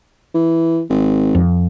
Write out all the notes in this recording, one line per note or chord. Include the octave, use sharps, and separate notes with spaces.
E3
G#1
F2